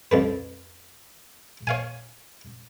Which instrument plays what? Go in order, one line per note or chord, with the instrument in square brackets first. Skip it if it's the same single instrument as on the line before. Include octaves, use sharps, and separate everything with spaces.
[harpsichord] C2 F2 B4
C#5 F5 G#5